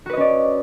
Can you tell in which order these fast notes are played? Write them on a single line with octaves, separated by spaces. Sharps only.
F#4 B4 D#5 C#4 D5